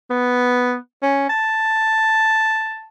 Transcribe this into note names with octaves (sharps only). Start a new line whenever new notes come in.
B3
C#4
A5